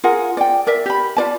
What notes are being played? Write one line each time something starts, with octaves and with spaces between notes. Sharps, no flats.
F4 G#4 A#4 F#5
D5 G5
A#4 D5 E5
G4 B5
F4 D5 A5